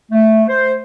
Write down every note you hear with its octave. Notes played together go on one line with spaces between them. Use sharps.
A3
C5